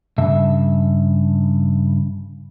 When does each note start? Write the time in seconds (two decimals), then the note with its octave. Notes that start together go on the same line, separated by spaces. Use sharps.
0.18 G2 C#3 E5